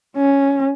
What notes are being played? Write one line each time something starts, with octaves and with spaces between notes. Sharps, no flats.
C#4